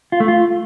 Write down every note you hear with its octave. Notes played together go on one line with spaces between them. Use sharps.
F4
A3
F4